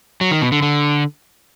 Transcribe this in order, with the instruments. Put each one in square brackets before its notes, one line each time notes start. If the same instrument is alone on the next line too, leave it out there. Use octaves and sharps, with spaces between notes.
[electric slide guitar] F#3
D#3
B2
D3
D3